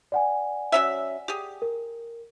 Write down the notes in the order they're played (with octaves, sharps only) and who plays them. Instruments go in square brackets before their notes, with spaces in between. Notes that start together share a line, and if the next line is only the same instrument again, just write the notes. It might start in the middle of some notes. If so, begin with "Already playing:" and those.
[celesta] D5 F#5 G#5
[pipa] F#3 C#4 E5
G4 G#4
[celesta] A#4